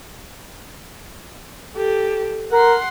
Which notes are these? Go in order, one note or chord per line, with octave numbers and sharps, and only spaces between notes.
G4 A4
A#4 F#5 C6